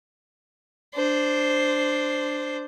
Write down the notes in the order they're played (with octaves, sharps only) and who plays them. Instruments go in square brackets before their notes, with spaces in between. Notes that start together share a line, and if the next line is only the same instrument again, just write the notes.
[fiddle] D4 C5